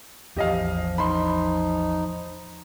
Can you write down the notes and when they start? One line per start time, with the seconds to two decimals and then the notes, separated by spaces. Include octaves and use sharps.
0.37 A1 E2 F3 G4 D#5 F5
0.98 D#4 B5 C6